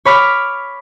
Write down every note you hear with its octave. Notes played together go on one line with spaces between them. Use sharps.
C#5 B5 D6 F6 B6